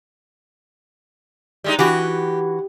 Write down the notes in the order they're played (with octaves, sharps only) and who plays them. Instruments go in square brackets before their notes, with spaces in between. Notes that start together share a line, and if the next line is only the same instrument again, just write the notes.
[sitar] G3 G#3 D#4
[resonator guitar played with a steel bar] E3 F#4 [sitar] G4